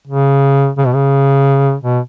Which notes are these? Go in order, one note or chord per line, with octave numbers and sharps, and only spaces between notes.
C#3
C#3
B2
C#3
B2